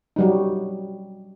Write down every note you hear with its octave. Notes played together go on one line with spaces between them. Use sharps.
F#3 G3 D#4